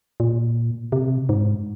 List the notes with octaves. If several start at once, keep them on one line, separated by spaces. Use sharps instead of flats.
A#2
C3
G#2